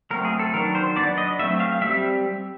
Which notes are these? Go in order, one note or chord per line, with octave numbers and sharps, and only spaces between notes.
F#3 A3 C4 A#4
G#4
A4
D#3 F#3 B3 D4 A#4
C5
F#3 B3 D4 D5
D#5
F#3 A3 C4 E5
F5
G3 C4 E5